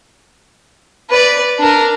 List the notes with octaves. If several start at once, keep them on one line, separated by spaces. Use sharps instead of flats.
B4 D5
D4 A#4